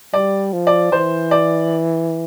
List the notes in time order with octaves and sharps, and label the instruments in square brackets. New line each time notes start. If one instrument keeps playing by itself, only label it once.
[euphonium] G3 [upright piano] D5
[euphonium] F3
[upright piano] D5
[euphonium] E3 [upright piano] C5
[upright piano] D5